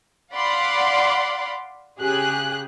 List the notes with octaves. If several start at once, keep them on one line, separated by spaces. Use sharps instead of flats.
D5 F5 F#5 B5 C6 D6
C#3 G4 G#4 F#6